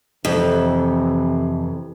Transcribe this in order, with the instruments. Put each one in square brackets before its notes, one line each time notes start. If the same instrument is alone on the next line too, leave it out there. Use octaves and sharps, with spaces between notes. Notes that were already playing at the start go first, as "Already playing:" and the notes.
[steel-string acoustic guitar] F2 [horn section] C3 E3